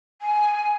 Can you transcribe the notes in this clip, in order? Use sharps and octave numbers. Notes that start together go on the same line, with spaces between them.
G#5